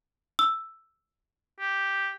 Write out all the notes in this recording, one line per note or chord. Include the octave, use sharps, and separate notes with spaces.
E6
G4